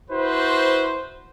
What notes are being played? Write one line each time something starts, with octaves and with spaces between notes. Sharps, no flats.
E4 F#4 B4 C5